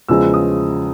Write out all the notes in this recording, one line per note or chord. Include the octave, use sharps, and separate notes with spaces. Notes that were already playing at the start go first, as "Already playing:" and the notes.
E2 C#3 F3 G#3 E6
D#6